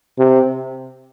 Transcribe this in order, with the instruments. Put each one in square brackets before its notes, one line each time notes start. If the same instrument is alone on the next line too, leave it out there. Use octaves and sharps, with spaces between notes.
[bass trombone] C3